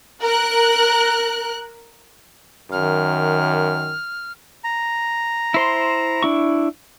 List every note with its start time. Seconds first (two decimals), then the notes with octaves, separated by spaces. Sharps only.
0.22 A#4 F#6
2.72 F#2 D#3 F6
4.64 A#5
5.54 E4 C5 C6
6.23 D4 E4 C#6